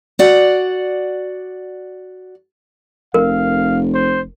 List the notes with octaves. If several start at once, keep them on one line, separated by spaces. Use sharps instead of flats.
F#4 D5 F#5
F1 A#4 F5
C5